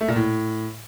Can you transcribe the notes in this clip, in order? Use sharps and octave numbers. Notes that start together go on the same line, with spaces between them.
A3
A#2
A2